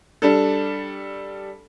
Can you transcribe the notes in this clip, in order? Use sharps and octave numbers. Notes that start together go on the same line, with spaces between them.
G3 D4 A4